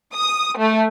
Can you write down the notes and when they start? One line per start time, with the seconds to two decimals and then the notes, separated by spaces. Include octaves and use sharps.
0.14 D#6
0.58 A3